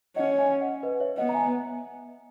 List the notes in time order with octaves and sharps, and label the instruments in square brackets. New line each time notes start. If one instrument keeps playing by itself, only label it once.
[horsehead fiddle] C#4 [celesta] D#5 F#5
[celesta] E5 G#5
D#5 F#5
B4 D#5
C#5 E5
[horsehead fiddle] B3 [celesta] D#5 F#5
[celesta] A#5
E5 G#5